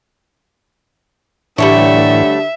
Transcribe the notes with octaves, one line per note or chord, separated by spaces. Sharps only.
A2 D3 E3 G3 A3 C#5 E5